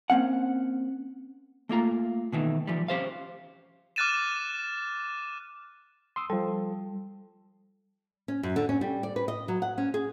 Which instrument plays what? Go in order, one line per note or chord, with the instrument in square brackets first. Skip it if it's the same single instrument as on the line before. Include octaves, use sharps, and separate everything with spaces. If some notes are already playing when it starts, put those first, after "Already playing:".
[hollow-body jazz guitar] A#3 C4 C#4 F#5
A3 A#3 F4 A#5
B2 D#3 E3 A3
E3 F3 G3
C#4 G4 C5 F5
[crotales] D6 F6 F#6 A6 D#7 E7
[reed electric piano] C6 D#6 E6
[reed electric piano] F3 A4 [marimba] G3
[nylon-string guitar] C#4
F#2
D3
C#4
G3
D5
B4
D#5
F#3
F#5
C#4
G#4